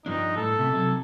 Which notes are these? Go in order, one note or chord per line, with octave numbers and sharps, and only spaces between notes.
G2 F3 D4 D#4
A2 A4
C3 A3
C3 F#3